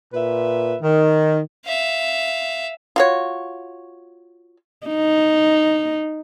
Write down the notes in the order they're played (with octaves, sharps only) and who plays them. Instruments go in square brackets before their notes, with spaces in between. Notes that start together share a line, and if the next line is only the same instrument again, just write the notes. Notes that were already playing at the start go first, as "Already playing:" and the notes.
[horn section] A#2 B4 E5
D#3
[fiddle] E5 F5
[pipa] F4 F#4 C#5
[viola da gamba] D#4